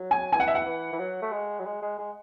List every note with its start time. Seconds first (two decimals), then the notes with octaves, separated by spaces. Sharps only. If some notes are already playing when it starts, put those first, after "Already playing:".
Already playing: F#3
0.11 G#5
0.32 E3 G#5
0.40 F#5
0.48 E5
0.55 F#5
0.66 E3
0.93 E3
0.99 F#3
1.22 A3
1.32 G#3
1.60 F#3
1.66 G#3
1.82 G#3
1.99 G#3